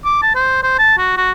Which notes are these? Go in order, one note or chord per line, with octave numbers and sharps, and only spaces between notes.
D6
A5
C5
C5
A5
F#4
F#4